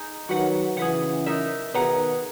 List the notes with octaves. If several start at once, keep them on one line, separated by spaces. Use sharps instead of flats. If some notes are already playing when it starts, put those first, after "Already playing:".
Already playing: D#4 G#4 D#5 A#5
D#3 F#3 F#4 B4 F#5
C#3 E3 G#4 B4 F#5
D#4 A#4 E5
B2 D#3 G#4 B4 F#5 A#5